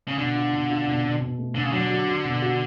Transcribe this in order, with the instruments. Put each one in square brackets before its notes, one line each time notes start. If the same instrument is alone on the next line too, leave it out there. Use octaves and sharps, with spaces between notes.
[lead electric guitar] C#3
[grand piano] B2 [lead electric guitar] D3
[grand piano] F4
B2
F4
B2
B2
B2
A3
[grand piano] B2 [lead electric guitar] D3
[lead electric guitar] C#3
[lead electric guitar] D3 [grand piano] F#3
[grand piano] F#4
F#4
B2
F#4